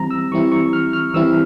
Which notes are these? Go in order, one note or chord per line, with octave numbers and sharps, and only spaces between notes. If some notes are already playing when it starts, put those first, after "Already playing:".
Already playing: E3 G3 C4 E4 A#5
E6
E3 G3 C4 E4 C#6
C#6
F6
F6
E3 G3 C4 E4 E6